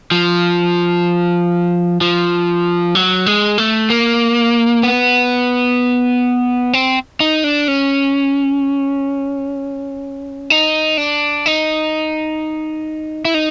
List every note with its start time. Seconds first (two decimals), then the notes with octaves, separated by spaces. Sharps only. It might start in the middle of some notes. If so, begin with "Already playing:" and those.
0.11 F3
2.01 F3
2.95 F#3
3.26 G#3
3.58 A3
3.90 A#3
4.83 B3
6.73 C4
7.20 D#4
7.44 D4
7.68 C#4
10.50 D#4
10.97 D4
11.46 D#4
13.25 E4
13.34 D#4